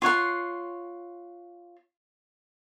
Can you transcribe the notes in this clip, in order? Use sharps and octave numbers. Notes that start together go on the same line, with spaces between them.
F4 C#5 F#5 C6